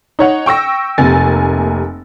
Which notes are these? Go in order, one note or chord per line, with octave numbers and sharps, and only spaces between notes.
D#4 C#5 F#5
G5 C#6 E6 A#6
F1 C3 A#3 G#5 A6